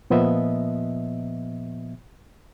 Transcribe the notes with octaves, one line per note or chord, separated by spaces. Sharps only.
A#2 F3 B3 D#5 E5